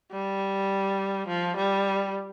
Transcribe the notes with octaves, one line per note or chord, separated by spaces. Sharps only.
G3
F3
G3